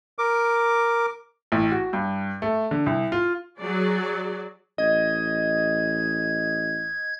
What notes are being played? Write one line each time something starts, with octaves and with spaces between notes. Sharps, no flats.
A#4 D6
A1
F#4
G2
A3
D3
C2
F4
F#3 G#4 D5
A1 D#5 G#6